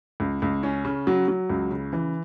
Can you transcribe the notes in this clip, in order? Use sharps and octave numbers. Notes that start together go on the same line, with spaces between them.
C#2
C#2
C#4
C#3
F#3
F#3
C#2
C#3
E3